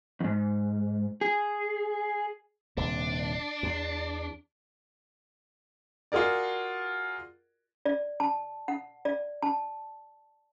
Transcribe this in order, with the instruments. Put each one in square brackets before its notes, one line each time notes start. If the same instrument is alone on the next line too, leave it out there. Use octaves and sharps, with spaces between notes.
[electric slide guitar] E2 G#2
G#4
[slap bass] D#1 C3 [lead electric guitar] D4
[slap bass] E2
[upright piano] F4 F#4 G#4 A#4 D5
[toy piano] D5
A5
F#5
D5
A5